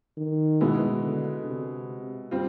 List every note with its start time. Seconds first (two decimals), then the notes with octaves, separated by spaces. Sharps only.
0.18 D#3
0.61 B2 G#3 B3 E4
1.03 D3
1.45 C3
2.31 G3 C4 F4